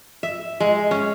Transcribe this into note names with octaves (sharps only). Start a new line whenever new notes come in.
E5
G#3
C#4